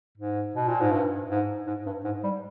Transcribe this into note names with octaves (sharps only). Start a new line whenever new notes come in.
G#2
B2
A#2
G#2
G2
G#2
G#2
G2
G#2
G3